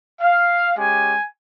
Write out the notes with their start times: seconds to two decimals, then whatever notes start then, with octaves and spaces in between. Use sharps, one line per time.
0.22 F5
0.76 G#3 C#4 G4 G#5